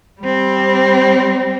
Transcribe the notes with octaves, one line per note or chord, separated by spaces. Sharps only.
G3 C4